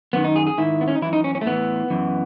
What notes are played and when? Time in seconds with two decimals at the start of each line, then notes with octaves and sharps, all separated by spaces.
0.13 F#2 D#3 B3
0.24 D#4
0.36 G#4
0.47 G#4
0.58 G#2 D#3 E4
0.81 B3
0.88 C#4
0.95 D#4
1.02 F#2 E3 E4
1.13 D#4
1.24 C#4
1.35 C#4
1.41 A3
1.46 A2 E3 B3
1.90 F#2 E3